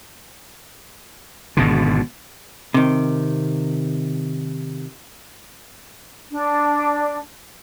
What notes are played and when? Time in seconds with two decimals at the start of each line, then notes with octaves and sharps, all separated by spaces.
1.57 G#1 B2 D3
2.74 C3 D#3
6.31 D4